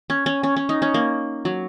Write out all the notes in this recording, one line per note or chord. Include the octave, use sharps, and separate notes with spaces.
C#4
C#4
C#4
C#4
D#4
C#4
A#3
F#3